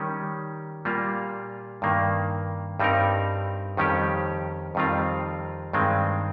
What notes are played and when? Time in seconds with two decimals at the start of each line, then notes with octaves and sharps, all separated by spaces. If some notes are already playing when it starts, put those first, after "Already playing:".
Already playing: D#3 G3 C#4
0.85 A#2 G3 A#3 F4
1.82 G2 D#3 A#3
2.80 G2 G3 C4 D#4 A#4
3.77 F2 D#3 G3 C#4 G4
4.75 F2 D#3 G3 C4 F4
5.73 G2 D#3 G#3 C4